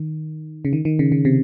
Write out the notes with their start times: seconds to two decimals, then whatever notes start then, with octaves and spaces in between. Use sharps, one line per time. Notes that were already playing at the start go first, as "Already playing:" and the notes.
Already playing: D#3
0.65 C#3
0.73 D#3
0.85 D#3
0.99 C#3
1.12 C#3
1.25 C3